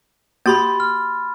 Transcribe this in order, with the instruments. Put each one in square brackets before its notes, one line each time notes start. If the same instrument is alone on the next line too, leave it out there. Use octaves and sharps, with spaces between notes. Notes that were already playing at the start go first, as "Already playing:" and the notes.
[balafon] A#3 F#4 G4 [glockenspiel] B5 C6 A6
[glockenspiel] F6